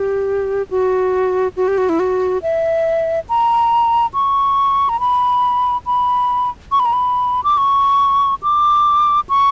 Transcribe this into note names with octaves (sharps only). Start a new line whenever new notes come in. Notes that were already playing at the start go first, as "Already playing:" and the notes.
Already playing: G4
F#4
F#4
G4
F#4
E4
F#4
E5
A#5
C#6
A#5
B5
B5
C#6
B5
A#5
B5
D6
C#6
D6
C#6